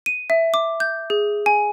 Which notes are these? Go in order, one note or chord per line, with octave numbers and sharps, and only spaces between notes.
D#7
E5
D6
G6
G#4
G#5